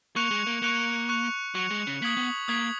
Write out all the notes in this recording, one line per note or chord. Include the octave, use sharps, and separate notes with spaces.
A#3 C#6 F#6 C#7 F7
G#3
A#3
A#3 C#6 F#6 C#7 F7
C#6 F#6 C#7 F7
F#3 C#6 F#6 C#7 F7
G#3
C#3
A#3 D#6 G#6 B6 F#7
B3
A#3 D#6 G#6 B6 F#7